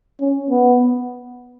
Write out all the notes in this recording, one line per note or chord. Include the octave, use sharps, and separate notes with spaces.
C#4
B3